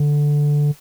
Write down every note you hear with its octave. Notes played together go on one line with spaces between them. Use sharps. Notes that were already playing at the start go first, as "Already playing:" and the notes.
Already playing: D3